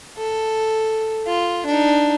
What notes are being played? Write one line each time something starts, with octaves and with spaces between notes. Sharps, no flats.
A4
F4
D4 D#4